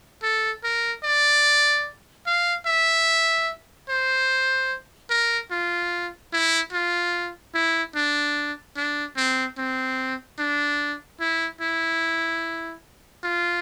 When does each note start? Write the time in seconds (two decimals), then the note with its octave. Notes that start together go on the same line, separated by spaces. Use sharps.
0.23 A4
0.64 A#4
1.04 D5
2.26 F5
2.66 E5
3.89 C5
5.10 A#4
5.51 F4
6.33 E4
6.73 F4
7.54 E4
7.95 D4
8.77 D4
9.17 C4
9.58 C4
10.39 D4
11.20 E4
11.61 E4
13.24 F4